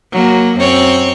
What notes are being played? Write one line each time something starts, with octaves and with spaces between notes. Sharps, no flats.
F#3 A#3
F#2 C4 C#5